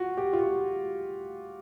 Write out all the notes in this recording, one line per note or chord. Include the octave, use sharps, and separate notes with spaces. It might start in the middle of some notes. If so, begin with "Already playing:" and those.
Already playing: F4 F#4
G4
F4
F#4